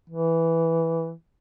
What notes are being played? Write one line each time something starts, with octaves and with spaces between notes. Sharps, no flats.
E3